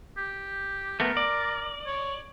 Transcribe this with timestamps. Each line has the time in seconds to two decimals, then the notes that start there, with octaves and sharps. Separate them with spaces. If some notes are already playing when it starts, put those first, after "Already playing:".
0.18 G4
1.00 A3 B3 A#4
1.17 D5
1.86 C#5